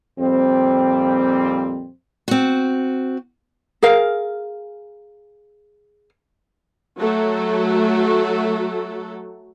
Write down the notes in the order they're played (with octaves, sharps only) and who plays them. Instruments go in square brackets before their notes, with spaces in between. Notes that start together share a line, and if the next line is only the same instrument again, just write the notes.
[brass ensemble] F2 A#2 G3 C4
[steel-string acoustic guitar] C4 F#4
[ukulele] G#4 A#4 F5
[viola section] F#3 A3 F#4 A4